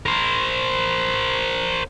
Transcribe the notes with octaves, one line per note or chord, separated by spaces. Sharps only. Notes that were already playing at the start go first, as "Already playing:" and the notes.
A#4 C5